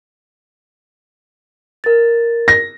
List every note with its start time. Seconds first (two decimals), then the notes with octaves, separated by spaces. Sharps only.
1.84 A#4 A6
2.48 A#6